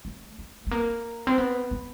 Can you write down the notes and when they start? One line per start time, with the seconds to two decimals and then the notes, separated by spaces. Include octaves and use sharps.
0.05 A3
0.39 A3
0.67 A3
0.71 A#3
1.27 C4
1.38 B3
1.71 B3